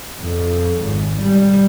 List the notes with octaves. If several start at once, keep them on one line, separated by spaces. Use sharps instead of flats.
F2
G#1
G3